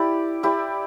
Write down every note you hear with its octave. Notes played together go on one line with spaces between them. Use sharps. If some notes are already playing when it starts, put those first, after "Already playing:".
Already playing: E4 G4 D5
E4 G4 D5